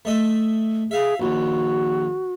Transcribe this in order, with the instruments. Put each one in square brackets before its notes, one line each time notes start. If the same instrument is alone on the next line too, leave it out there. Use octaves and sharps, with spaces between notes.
[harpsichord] A3 D#5 E5
[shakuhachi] G#4 [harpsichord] E5 F5
[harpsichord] A#1 D#2 [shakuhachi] F#4